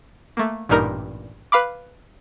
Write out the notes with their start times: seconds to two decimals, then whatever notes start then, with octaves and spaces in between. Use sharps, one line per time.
0.37 A3 A#3
0.69 A1 G2 A#2 G3 D#4 A#4
1.52 B4 F5 B5 D6